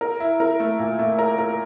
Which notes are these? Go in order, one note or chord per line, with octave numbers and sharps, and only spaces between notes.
A#4
E4
A#4
A3
A#2
A3
A#4
A#4